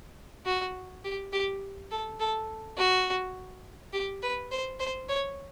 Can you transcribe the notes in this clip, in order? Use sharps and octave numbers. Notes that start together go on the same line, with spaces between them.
F#4
G4
G4
A4
A4
F#4
G4
B4
C5
C5
C#5